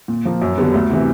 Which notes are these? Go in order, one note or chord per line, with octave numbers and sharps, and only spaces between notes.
A#2
F3 A#3
F#2
D3 G3 B3
D2
C3 E3